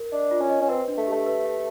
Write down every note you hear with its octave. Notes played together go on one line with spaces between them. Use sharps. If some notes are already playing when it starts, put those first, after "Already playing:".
Already playing: A#4
D4 D#5
F4
C#4
D#5
C#4
C4 B4
D4
A3
G4
A3
B4
E5